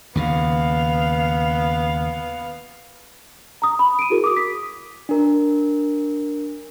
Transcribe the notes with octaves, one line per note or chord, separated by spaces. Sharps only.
D#2 C#3 B3 F5
A#5 D#6
B5
D7 D#7
E4 F#4 G#4 A#4
D6 D#6
B6
D4 A#4